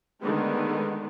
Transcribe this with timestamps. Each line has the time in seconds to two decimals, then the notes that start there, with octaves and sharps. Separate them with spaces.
0.22 D3 D#3 G#3 A3 B3